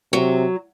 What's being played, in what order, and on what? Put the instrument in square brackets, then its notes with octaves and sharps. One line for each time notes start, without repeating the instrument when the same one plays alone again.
[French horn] C3 [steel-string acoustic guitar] F#3